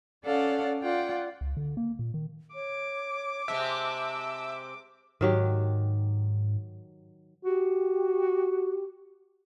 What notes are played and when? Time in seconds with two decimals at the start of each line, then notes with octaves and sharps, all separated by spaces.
0.24 C#4 A4 D5 F5 F#5
0.83 F4 D5 F#5 G5
1.41 C#2
1.57 D3
1.77 A#3
1.99 A#2
2.14 D#3
2.54 C#5 D6
3.48 C3 G#3 C4 E5 A5
5.21 G#2 D#3 F#3 G4
7.43 F#4 G4